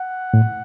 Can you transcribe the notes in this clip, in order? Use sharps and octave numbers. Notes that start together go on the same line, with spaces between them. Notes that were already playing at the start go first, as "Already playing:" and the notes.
Already playing: F#5
A2